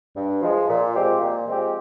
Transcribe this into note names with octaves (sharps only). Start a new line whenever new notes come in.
G2
F3 G#3
A#2
F3 G#3 C4 G4
A#2
F3 G#3 C4 G4